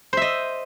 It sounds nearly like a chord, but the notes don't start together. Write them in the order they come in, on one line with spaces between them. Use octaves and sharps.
C5 E5 D#5